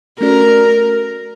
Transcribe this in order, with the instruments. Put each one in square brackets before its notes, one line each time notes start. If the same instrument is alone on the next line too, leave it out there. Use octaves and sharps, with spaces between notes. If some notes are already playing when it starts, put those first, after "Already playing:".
[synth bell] A3 C#4 F#4 A4 D5 [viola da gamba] A#4